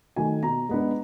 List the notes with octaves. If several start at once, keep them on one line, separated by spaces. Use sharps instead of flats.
D#3 F#3 A3 G#5
B2 A#5
G#3 B3 D4